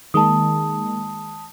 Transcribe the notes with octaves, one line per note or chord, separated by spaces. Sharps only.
D#3 G#3 A#3 A5 D#6